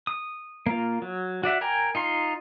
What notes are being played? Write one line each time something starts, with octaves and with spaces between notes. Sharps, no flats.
D#6
A#3 F4
F#3
F#4 D5 E5 F#5
A#4 G5 G#5 A#5
D#4 F4 C6